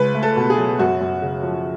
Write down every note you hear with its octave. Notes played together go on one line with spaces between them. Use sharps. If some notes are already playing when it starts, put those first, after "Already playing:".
Already playing: C#2 B4
A3
A4
B2
G#4
F#3
F#2 F#4
F#2
C#3
F3